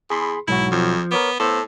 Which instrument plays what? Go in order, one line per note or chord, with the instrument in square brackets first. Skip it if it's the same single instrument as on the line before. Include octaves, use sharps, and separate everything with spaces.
[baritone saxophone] E2 [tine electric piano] G#4 B5 C6
[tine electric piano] B1 F#3 F#4 [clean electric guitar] G#2 [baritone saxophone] E4
[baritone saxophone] F2 [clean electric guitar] F3
[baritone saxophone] B3 [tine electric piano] A#4 C#5 D6
[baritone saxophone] A2 [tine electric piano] B3 C5 [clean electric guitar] A4